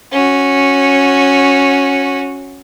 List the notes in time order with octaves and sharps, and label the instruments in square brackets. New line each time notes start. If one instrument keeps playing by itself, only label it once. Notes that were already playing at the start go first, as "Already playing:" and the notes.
[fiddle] C#4 F#4